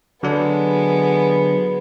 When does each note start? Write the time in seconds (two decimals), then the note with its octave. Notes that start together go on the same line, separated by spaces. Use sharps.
0.23 D3 F#3 G#3 B3 D4